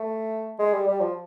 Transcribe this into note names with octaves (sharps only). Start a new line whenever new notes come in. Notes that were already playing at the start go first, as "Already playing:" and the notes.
Already playing: A3
G#3
G3
G3
F3